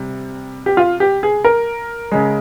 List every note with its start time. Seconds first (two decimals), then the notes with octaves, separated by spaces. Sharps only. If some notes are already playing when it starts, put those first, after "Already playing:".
Already playing: C3 G3
0.66 G4
0.77 F4
1.00 G4
1.23 G#4
1.44 A#4
2.12 C#3 G#3